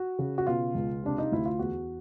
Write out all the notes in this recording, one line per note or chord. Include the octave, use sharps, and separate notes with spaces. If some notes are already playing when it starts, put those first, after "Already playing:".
Already playing: F#4
C#3
F#4
B2 F4
C#2
C3 D4
D#4
D2 E4
F4
E2 F#4